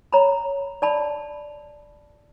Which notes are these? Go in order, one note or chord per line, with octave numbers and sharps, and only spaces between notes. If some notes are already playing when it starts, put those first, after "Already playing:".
C#5 A#5 B5
D5 A5 B5